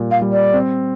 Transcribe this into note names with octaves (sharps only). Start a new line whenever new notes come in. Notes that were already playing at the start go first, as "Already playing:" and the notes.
Already playing: A#2 G3
F5
G3
D5
C4